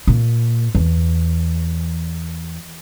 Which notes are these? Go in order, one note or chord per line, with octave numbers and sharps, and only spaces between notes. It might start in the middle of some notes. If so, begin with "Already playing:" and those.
A#2
E2